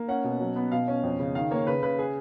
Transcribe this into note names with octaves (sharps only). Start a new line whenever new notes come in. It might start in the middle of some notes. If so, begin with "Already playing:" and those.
Already playing: A#3
C#4 F#5
B2
F#3
B3
B2 F5
C#4
F2
C#3
D#3 F5
A#3 C#5
C#3 B4
C#3 B4
G#4